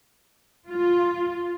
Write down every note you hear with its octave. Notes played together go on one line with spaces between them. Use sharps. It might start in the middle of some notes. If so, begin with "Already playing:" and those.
F4